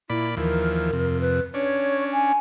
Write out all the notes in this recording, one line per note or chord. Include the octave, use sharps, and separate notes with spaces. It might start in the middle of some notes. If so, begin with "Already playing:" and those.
A#2 E4 D5 B5
D#2 E3 F3 A#4
F2 C3
B4
C#4 D4 C#5
G#5